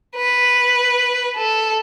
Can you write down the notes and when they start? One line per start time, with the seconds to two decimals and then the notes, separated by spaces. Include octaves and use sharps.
0.17 B4
1.37 A4